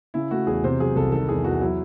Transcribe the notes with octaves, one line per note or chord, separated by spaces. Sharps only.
C#3 E4
A3 F#4
E2 G#4
C3 C5
F#3 G#4
C2 A4
D#3 A4
E2 G#4
E2 F#4
F#3 E4